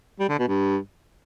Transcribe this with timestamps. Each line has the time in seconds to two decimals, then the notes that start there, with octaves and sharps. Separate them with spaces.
0.19 G3
0.29 D3
0.39 B2
0.48 G2